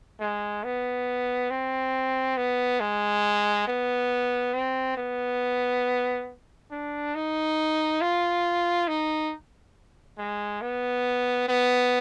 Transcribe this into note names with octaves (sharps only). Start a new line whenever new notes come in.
G#3
B3
C4
B3
G#3
B3
C4
B3
D4
D#4
F4
D#4
G#3
B3
B3